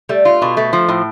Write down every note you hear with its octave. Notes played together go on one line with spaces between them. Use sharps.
G3 A3
F4
B2
A3
F3
A2